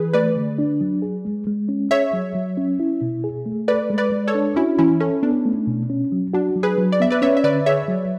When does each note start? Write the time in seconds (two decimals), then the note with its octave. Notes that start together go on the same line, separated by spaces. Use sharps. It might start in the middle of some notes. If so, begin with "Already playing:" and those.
Already playing: E3 G#4 B4
0.13 A3 B4 D5
0.36 D3
0.58 D4
0.81 F#3
1.02 G#4
1.25 G#3
1.47 G#3
1.69 C#4
1.91 G#4 C#5 E5
2.13 F#3
2.35 F#3
2.57 C#4
2.80 E4
3.02 B2
3.24 G#4
3.46 A3
3.68 A4 B4 D5
3.90 G#3
3.98 B4 D5
4.12 G#3
4.28 A4 C#5
4.35 D4
4.56 C#4 E4 F#4
4.79 E3 C#4 E4
5.00 C#4 A4
5.23 B3 D4
5.45 A3
5.67 B2
5.90 C#4
6.12 F#3
6.34 D4 F#4
6.56 F#3
6.63 G#4 B4
6.78 F#3
6.92 D5
7.00 B3 E5
7.10 B4 D5
7.22 C#4 C#5 E5
7.37 E5
7.44 D3 B4 D5
7.66 G#4 C#5 E5
7.88 F#3